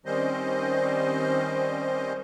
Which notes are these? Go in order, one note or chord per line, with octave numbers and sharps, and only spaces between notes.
D#3 G3 C4 C#4 C5 D#5